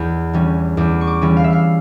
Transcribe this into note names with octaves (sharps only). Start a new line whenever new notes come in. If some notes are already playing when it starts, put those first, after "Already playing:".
Already playing: E2
E3 G3 C#4
E2 D6
C#6
D6
E3 G3 C#4
F5
E5
F5